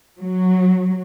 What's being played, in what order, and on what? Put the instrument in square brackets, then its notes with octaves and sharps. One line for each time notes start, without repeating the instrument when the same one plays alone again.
[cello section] F#3